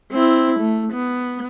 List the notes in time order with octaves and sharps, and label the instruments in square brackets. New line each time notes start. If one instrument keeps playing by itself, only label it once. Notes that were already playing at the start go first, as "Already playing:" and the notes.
[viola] C4 E4
A3
B3